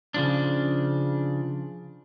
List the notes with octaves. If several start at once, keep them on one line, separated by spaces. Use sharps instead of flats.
C#3 F3 D4